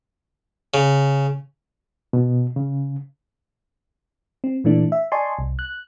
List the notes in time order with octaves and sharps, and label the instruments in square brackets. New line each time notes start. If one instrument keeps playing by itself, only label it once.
[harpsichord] C#3
[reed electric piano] B2
C#3
[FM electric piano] C4
A#2 E3 A3 D4
E5
D5 D#5 G#5 A5 C6 C#6
C2
F#6